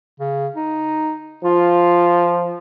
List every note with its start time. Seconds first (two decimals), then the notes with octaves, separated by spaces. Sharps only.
0.20 C#3
0.56 D#4
1.44 F3 F4